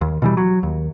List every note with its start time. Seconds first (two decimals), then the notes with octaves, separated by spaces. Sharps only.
0.01 D#2
0.22 B2 E3 G3
0.37 F#3
0.63 D#2